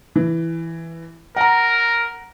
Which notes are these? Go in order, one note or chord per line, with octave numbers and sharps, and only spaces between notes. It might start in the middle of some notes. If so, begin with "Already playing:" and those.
E3
A#4 F#5 A#5